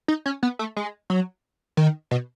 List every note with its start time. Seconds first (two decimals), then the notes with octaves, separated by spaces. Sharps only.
0.08 D#4
0.26 C#4
0.43 B3
0.59 A3
0.77 G#3
1.10 F#3
1.77 D#3
2.11 B2